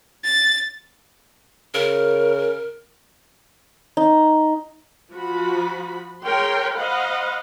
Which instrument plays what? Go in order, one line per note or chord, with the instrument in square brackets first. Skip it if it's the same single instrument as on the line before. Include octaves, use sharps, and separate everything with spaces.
[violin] A6
[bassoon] C#3 [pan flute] A#4
[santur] D#4
[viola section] F3 F#4 B5
G#4 A#4 C#5 G5 C6
C5 D#5 F5 F#5 B5